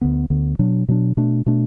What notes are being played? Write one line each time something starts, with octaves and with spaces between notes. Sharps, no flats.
D2 D3 B3
D2 D3 B3
B2 F#3 D4
B2 F#3 D4
B2 A3 D4
B2 A3 D4